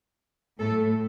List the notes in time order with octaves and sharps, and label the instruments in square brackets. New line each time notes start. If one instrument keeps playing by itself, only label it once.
[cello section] A2 A3 A4